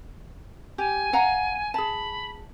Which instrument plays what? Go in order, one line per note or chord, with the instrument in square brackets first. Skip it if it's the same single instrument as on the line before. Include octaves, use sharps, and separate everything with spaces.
[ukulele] G4 [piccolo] G#5
[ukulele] F5 F#5 A#5
[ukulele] G#4 A5 [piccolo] B5